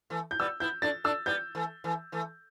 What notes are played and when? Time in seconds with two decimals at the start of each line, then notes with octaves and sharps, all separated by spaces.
0.10 E3 A3
0.31 G6
0.39 G3 B3 E6
0.60 B3 E4 G6
0.82 A3 D4 A6
1.04 A3 D4 E6
1.26 G3 B3 G6
1.55 E3 A3
1.84 E3 A3
2.12 E3 A3